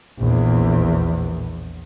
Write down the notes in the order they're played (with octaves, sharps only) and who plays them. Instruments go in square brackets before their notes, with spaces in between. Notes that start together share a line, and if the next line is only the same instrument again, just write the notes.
[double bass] A#1 E2